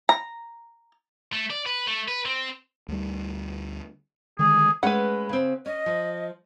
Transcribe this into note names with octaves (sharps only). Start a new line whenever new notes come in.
A#5
A3
D5
B4
A3
B4
C4
D2 G3
D3 D#3 G#3 G#4
G#3 A3 C#4 B4 F#5 B5
C#3 C4
C#4 D#5
F3